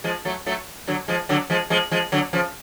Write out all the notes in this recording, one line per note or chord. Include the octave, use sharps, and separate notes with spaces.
F3 G#3
F#3 A3
F#3 A3
D3 F#3
F3 G#3
D3 F#3
F3 G#3
F3 G#3
F3 G#3
D3 F#3
C#3 F3